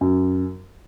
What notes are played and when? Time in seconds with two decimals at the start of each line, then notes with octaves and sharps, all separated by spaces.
0.01 F#2